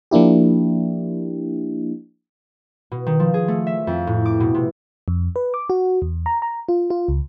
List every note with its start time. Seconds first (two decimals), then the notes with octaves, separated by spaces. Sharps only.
0.11 F3 A#3 D4 E4 G4
2.92 B2
3.06 D#3
3.20 F3
3.34 G#4
3.48 A3
3.67 E5
3.87 F2
4.07 A2
4.26 D6
4.40 B2
4.54 C3
5.08 F2
5.36 B4
5.54 D6
5.70 F#4
6.02 E2
6.26 A#5
6.42 A#5
6.69 F4
6.90 F4
7.08 C#2